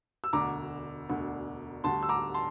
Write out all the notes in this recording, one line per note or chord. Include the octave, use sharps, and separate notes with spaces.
E6
E1 D2 D3 A#5 D6
E1 D2 D3
D2 D3 G3 A5 C6
E6
A#5 D6
A5 C6